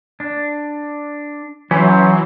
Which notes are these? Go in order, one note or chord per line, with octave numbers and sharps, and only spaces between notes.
D4
E3 F#3 C#4 C5